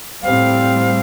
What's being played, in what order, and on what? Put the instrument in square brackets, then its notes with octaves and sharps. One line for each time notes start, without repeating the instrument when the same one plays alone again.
[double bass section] A2 G3 C4 [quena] F5